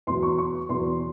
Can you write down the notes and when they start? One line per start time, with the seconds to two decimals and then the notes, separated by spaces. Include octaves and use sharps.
0.07 E2 B2 F#3 C6
0.23 C#6
0.38 C#6
0.69 E2 B2 F#3 C6